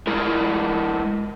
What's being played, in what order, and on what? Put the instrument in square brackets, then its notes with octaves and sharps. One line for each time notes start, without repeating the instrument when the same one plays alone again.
[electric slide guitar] G#3 E4 A#4